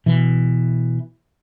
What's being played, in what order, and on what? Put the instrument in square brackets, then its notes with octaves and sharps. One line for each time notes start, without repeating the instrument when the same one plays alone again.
[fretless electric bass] B2 E3